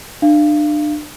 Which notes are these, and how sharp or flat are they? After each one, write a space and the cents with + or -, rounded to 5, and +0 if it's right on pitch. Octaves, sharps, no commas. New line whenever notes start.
D4 +30 F5 -25